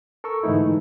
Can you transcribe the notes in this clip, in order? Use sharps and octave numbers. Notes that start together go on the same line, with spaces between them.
A4 A#4 C#6 E6
G#2 D3 E3 A3 D#4 E4